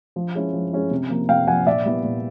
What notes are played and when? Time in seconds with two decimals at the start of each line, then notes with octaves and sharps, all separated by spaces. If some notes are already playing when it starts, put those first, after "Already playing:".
0.16 F3
0.35 G#3 C#4 E4
0.53 F3
0.73 G#3 C#4 E4
0.91 C3
1.10 F3 A#3
1.29 C3 F5 G5
1.47 F3 A#3 F#5 G#5
1.66 A#2 D5 E5
1.85 G3 B3 E4
2.04 A#2